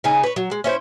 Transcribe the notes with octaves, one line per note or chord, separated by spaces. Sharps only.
C#3 D#4 G#4
B4 C#5
F#3
G#3
C#4 E4 C5